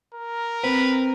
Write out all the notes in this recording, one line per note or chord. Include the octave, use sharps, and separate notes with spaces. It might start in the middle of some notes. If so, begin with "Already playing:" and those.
A#4
C4 B4